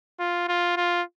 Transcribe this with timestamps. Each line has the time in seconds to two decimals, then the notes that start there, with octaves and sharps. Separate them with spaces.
0.20 F4
0.49 F4
0.77 F4